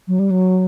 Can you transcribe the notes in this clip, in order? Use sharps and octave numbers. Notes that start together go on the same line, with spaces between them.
F#3
G3
F#3